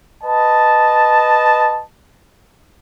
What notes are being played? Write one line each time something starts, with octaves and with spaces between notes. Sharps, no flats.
B4 D#5 A5